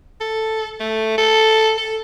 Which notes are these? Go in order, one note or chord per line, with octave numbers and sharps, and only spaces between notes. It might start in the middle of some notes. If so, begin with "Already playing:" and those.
A4
A3
A4
A4